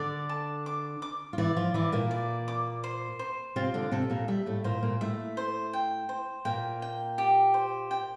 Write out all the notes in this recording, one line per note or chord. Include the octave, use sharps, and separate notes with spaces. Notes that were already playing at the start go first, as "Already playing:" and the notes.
Already playing: D3 D4 D5
A5
D6
D6
F4
E3 E4 D5
F3 F4
E3 E4 D6
A#2 A#3
D5
D6
C5
C5
C3 C4 F4
D3 D4
C3 C4 A4
A#2 A#3
G3 E5
A2 A3
A#2 A#3 C5
A#2 A#3
A2 A3 E5
C5
G5
C5
A#2 A#3 G5
G5
G4
C5
G5